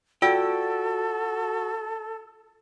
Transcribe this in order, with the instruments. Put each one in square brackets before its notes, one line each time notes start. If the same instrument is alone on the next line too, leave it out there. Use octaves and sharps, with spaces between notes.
[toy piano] F4 D5 E6 [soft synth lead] F#4 [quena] A4 [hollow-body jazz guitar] G5